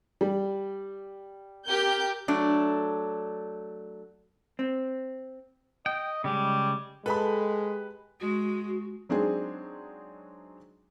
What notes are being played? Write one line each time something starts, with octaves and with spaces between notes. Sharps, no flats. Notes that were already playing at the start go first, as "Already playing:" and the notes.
G3
G4 A#4 G6
F#3 A3 D4
C4
D#5 G5
C#3 G3 G#3
G#3 G4 A4 B4 B5
G#3 F#4
F#3 G#3 C4 D4 D#4 G#4